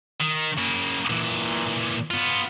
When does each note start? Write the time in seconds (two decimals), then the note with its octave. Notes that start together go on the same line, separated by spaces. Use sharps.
0.21 D#3
0.58 C#3 A#3
1.10 A#2 E3
2.11 B3 F4